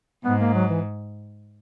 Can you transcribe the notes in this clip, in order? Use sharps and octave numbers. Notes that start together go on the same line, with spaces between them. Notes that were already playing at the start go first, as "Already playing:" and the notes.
G#2 B3
A#3
F#3
E3